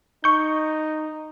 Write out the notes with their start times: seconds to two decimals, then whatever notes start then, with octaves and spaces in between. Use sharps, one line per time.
0.24 D#4 C#6 G6